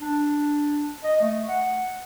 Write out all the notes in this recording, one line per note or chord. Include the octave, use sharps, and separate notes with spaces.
D4
D#5
A3
F#5